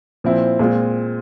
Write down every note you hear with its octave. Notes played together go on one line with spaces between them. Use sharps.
A#2 F3 C4 E4
A#2 G#3 C4 F4